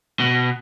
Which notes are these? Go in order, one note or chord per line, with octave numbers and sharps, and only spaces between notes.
B2